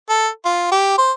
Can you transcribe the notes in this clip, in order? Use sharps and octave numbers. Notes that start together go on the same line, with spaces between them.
A4
F4
G4
C5